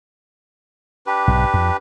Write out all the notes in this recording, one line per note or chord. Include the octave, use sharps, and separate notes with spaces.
D4 G4 B4
B1 G#2
F2